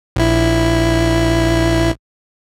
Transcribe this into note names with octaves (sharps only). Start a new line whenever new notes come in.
A#1 E4